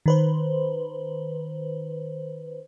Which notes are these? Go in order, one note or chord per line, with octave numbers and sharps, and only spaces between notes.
D#3 B4 C5